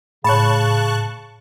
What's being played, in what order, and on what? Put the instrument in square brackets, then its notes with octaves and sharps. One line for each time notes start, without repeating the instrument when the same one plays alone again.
[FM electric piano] A2 [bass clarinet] C#3 [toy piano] C#5 B5 [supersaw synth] A5 C#6 F#6